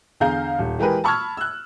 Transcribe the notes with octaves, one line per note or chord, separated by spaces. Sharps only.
E2 D3 G#4 F5 A#5 G6
D#1
E3 G#3 G4 G#4 A#4 B4
A5 B5 C#6 E6 F6 G#6
E6 F#6